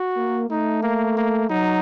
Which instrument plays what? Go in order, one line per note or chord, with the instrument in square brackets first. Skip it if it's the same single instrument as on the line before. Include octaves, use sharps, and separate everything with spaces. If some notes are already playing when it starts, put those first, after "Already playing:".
Already playing: [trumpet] F#4
[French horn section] A#3
[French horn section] A3 [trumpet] D#4
[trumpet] A#3
A#3
[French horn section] F#3 [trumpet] D#4